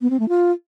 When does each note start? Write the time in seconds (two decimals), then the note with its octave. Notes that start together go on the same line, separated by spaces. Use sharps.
0.01 B3
0.10 C4
0.20 A3
0.29 F4